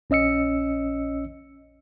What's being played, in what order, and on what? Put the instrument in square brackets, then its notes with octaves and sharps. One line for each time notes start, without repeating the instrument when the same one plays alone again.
[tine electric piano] A#1 C#4 D#5 E6 C#7